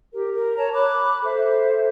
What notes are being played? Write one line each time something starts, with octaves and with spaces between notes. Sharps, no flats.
G4 A#4
A#4
C#5 A5 A#5
B5 D6 F#6
A4 C5 E5